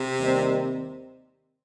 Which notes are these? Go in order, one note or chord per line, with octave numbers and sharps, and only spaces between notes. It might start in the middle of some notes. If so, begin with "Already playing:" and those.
Already playing: C3
D#2 D#3 G3 C4